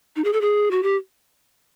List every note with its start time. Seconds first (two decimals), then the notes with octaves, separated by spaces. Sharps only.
0.16 D#4
0.24 G#4
0.33 A4
0.41 G#4
0.71 F#4
0.83 G4